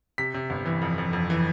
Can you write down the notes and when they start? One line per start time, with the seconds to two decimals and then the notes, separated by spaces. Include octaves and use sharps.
0.18 C3 B6
0.34 C3
0.50 G1
0.66 E3
0.81 F2
0.98 F2
1.13 F2
1.30 E3